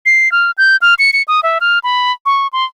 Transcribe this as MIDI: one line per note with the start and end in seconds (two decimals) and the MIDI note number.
0.06 0.31 96
0.32 0.51 89
0.58 0.77 91
0.82 0.94 89
0.99 1.11 97
1.13 1.22 97
1.28 1.40 87
1.43 1.58 76
1.61 1.79 89
1.84 2.12 83
2.26 2.47 85
2.53 2.65 84